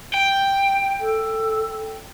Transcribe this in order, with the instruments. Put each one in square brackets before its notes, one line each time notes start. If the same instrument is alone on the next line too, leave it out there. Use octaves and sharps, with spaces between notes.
[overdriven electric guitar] G5
[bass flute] A4